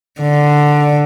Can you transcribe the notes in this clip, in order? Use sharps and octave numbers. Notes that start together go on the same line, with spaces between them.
D3